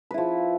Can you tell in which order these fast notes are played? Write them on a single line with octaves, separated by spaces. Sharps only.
B4 E4 F3